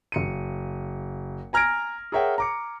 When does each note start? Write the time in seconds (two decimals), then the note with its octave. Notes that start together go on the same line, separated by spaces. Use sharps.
0.12 F#1 C#7 D#7
1.53 G#5 A#5 F6 G#6 A#6 D7
2.12 G#4 A#4 C#5 E5 F#5 G5
2.38 A#5 D6 C#7